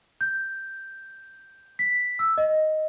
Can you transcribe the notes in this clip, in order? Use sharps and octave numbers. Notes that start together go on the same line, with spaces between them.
G6
B6
E6
D#5